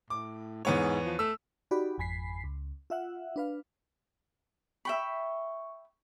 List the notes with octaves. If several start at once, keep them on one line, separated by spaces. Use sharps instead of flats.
A2 D6
E2 G#2 B3 C#5
F3
A3 E6
D#4 F#4 G4 D5 B5
G#1 F2 G#5 B5 B6 C7
C#2
F4 E5 F#5
D4 B4 F5
E5 G5 B5 C#6